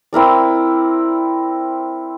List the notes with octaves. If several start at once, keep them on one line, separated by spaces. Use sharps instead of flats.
C4 E4 A#4 D5